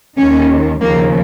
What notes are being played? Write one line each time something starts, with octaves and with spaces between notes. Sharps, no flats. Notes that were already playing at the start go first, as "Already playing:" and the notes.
D#2 D#3 C#4
D#2 C#3 F3 A#3